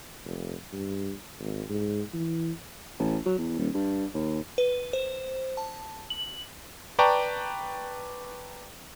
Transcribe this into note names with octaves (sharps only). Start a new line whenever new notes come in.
F1
G2
G#1
G#2
E3
A1
F#3
E2
D#1
G2
D#2
B4
C5
A5
F#7
B4 D5 G5 A5 A#5 C#6